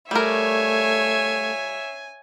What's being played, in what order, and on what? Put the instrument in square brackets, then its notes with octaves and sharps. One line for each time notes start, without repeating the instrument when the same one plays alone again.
[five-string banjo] G3 A#4 [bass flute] A3 [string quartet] C#5 E5 F5 [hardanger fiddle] G#5